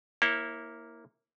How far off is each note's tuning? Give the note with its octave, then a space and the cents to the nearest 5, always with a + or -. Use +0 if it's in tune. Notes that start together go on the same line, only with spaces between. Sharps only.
A#3 +0 E4 -15 C#5 -35